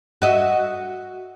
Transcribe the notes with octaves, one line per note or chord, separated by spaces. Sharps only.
F#4 D#5 E5